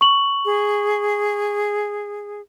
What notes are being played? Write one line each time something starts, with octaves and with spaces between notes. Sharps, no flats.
C#6 F#7
G#4